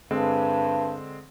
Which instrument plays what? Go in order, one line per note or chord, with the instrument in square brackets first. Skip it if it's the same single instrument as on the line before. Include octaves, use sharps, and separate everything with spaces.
[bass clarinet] G2 [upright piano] D3 G#3 C4